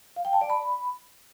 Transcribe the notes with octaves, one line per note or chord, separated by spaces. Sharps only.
F5
G5
A5
D5
B5